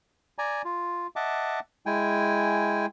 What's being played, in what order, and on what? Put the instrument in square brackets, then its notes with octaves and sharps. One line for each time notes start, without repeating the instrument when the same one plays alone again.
[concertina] D5 G#5 A#5
F4
D#5 E5 F#5 A5 D6
G#3 E4 G5 G#5